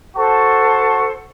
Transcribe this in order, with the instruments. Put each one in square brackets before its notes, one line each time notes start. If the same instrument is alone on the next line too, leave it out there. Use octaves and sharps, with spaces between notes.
[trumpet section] F#4 A5 C#6 [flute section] A4 C5